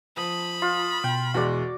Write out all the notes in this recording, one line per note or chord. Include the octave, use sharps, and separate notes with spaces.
F3 B5 D#6
F4
B2 G5
E2 G#3 F#4 D5